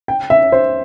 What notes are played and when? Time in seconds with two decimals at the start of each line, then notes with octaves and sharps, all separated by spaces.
0.08 G5
0.30 E5
0.52 C5